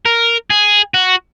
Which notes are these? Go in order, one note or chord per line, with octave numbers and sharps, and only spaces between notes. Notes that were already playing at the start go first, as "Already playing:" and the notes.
A#4
G#4
F#4